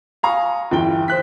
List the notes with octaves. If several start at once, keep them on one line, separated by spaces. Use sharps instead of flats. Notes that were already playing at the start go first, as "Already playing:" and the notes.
F5 G#5 A#5 C#6 D#6
G1 E3 G5 G7
C5 F#6 B6